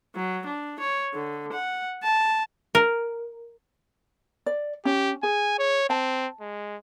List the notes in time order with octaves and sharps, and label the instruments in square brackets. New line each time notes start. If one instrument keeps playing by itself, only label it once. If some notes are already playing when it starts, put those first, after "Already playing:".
[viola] F#3
D4
C#5
D3
F#5
A5
[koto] A#4
[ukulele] D5
[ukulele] C#4 [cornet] G4
[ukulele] G#4 [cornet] G#5
[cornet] C#5
[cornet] C4 [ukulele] A5
[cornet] G#3